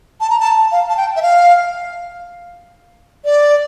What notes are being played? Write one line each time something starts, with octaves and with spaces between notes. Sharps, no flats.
A5
A#5
A5
F5
A5
G5
E5
F5
D5